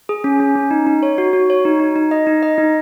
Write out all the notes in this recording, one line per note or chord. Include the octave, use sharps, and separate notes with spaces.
G#4
C#4
C#4
C#4
D#4
D#4
C#5
F#4
F#4
C#5
D#4
D#4
D#4
D#5
D#4
D#5
D#4